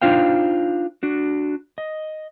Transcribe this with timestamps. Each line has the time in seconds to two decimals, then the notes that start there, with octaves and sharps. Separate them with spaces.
0.01 D4 D#4 F4 C5 F5 G5
1.03 D4 F#4
1.78 D#5